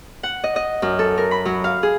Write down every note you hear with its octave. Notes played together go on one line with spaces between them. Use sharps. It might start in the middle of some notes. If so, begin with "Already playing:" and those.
F#5
D#5
D#5
F#2
A4
A#4
B5
F#3
F5
G#4